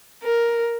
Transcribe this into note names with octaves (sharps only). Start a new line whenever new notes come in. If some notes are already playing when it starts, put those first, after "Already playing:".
A#4